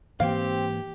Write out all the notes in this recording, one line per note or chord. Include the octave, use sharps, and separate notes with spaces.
G#2 E3 A#3 C4 G4 F5